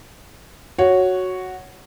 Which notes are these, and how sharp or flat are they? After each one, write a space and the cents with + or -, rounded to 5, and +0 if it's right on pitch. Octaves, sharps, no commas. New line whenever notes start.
F#4 +0 C#5 +0